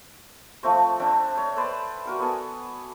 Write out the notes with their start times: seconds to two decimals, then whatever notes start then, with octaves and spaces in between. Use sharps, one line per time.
0.63 F3 A3 C4 C#6
0.99 C4 D4 E5 G5
1.37 C#5
1.56 B4 C5 D5 E6
2.06 F#4 A#4 F#5
2.19 B3 A4 G#5